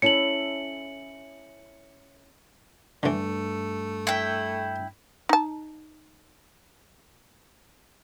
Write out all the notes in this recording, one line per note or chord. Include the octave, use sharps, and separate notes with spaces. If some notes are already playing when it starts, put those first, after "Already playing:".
C#4 E4 A4 C#7 F#7
G2 D3 E3 A3
E4 G5
D#4 A5